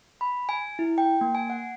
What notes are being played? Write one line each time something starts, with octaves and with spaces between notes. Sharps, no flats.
B5
G#5
E4
G5
A#3
G#5
F#5